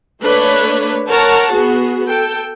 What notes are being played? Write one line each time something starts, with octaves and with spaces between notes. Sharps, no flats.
A3 A#3 D4 B4 C#5
A#4 C#5 F#5 A5
B3 F#4 G#4
A4 G5